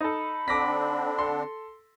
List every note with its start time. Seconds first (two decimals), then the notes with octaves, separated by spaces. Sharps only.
0.01 D#4 A4 B5
0.48 D3 C4 D4 D6 A#6 B6
1.18 A4 C6